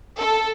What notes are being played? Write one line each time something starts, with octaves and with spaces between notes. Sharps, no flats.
A4